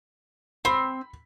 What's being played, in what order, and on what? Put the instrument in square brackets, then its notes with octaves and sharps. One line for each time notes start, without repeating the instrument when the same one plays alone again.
[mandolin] C4 [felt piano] B5